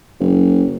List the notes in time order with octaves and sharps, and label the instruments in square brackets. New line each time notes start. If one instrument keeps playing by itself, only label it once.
[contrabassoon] F#1